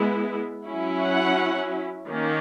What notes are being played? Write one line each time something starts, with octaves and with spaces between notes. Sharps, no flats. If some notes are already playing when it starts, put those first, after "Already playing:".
Already playing: G#3 B3 E4
F#3 C#4 E4
F#5
D#3 A#3 C#4